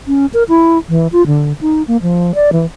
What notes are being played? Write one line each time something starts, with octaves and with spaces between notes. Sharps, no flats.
C#4
A#4
E4
E3
F4
D3
D#4
A#3
F3
D5
E3